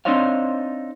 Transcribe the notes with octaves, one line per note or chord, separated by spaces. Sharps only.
C4 D4 D#4 C5 C#5 F5